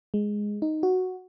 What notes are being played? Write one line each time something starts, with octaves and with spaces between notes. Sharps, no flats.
G#3
D#4
F#4